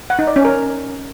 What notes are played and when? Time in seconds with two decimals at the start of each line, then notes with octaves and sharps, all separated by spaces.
0.10 F#5
0.19 D#4
0.27 D5
0.36 C#4
0.45 A#4